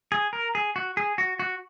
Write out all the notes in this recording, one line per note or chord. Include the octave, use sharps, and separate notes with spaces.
G#4
A#4
G#4
F#4
G#4
F#4
F#4